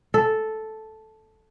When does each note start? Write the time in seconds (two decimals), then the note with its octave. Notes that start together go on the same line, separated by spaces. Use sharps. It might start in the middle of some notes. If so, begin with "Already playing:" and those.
0.14 A4